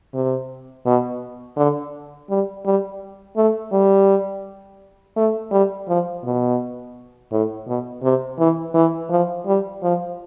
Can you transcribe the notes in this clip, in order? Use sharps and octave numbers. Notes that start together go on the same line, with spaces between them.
C3
B2
D3
G3
G3
A3
G3
A3
G3
F3
B2
A2
B2
C3
E3
E3
F3
G3
F3